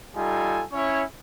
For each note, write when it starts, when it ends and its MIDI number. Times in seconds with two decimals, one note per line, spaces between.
0.16 0.63 55
0.16 0.63 63
0.16 0.63 65
0.16 0.63 69
0.16 0.63 80
0.72 1.03 61
0.72 1.03 64
0.72 1.03 73